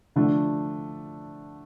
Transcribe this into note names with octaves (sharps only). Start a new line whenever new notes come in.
D3 F3 A3 D4